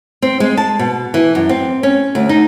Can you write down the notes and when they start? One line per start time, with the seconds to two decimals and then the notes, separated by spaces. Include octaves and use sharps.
0.22 C4
0.40 G#3
0.57 A5
0.79 B2
1.14 E3
1.35 F#2
1.49 C4
1.83 C#4
2.15 D2
2.29 D#4